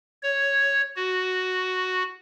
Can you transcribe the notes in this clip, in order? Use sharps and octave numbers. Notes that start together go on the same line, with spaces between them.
C#5
F#4